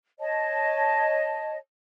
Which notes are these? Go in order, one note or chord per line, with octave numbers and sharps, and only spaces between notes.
C#5 D#5 A5